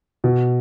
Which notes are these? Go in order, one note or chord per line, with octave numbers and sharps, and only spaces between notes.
B2